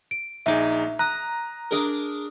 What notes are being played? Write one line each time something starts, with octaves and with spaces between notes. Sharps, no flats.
D7
A#1 D#4 G#4 D5 E5 G#5
A#5 D#6 F#6
D4 G#4 A#4